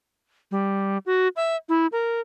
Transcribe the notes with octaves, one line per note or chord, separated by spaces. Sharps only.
G3
F#4
E5
E4
A#4